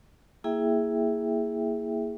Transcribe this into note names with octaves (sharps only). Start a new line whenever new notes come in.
A#3 E4 G#4 E5 G5